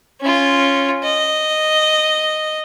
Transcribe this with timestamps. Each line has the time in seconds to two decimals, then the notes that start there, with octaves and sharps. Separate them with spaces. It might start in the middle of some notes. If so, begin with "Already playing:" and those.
0.21 C#4 F4
1.03 D#5